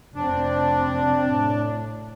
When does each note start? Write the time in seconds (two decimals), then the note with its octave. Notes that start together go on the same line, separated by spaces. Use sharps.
0.15 F1 C4 D4
1.30 A2